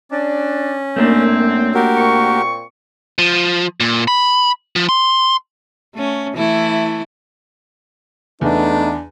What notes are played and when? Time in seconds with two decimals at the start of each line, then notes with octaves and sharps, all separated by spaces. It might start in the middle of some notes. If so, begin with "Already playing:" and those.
0.11 C#4 D4 D5
0.96 F#2 A3 A#3 C4 D4
1.75 F#4 G4 A#4
1.97 A#2 C4 C#6
3.19 F3
3.80 A#2
4.08 B5
4.76 F3
4.89 C6
5.95 A3 C#4
6.35 E3 A3 E4
8.41 E2 A3 B3 D4 D#4